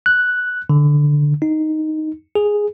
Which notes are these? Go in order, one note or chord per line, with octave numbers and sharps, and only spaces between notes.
F#6
D3
D#4
G#4